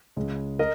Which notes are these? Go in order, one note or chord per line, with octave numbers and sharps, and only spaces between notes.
C#2 C#3 G#3
A#4 D#5